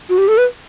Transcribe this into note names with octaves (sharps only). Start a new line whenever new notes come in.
F#4
G4
A4
B4